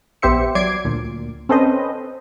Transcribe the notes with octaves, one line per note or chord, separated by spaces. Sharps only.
A#1 B3 G4 C5 E5 C#7
F#3 D5 D6 G#6 C7 D7
D2 A#2
C4 C#4 A4 B4 C5 D#5